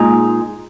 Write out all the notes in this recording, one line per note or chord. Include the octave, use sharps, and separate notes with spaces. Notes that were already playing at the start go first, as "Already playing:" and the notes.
Already playing: A#2 G#3 D#4 G#4